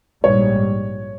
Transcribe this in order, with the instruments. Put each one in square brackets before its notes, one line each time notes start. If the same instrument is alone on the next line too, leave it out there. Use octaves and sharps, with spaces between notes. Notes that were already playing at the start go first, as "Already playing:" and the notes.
[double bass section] A#1 G#2 G3 [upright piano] C#5